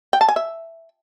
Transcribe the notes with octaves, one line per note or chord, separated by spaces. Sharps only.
G5
A5
G#5
E5